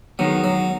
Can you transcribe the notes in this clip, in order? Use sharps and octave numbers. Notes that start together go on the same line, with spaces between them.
D#3 F#3 G#3 B3
F#3